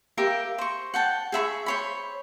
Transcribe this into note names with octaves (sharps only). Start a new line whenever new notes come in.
G4 A#4 E5 F5
C5 C#6
F#5 G5 A5
G#4 E5 B5 C#6
C5 C#5 B5